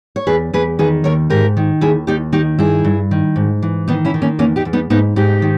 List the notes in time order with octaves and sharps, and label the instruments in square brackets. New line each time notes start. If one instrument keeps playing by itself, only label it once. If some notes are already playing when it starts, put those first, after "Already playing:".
[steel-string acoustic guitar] C#5
E2 G#4 B4
E2 G#4 B4
D#3 G#4 B4
D#2 A#4 C#5
G#2 G4 A#4
D#3
D#2 E4 G#4
D#2 D#4 G4
D#3 D#4 G4
G2 E4 G#4
G2
D#3
G#2
E3
D#3 B3 D#4
C#4 E4
D#3
A#3 C#4
E2 A#3 C#4
D#4 G4
E2
B3 D#4
G#2 B3 D#4
G#2 D#4 G4
D#3